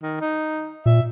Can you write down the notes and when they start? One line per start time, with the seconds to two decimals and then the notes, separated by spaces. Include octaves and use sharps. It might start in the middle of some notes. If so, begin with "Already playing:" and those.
0.02 D#3
0.21 D#4
0.86 A#2 E5